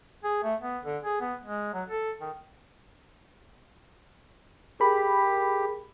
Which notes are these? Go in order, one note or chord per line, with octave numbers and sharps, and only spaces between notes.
G#4
A3
B3
D3
G#4
B3
G#3
F#3
A4
D#3
G4 G#4 A#4 B5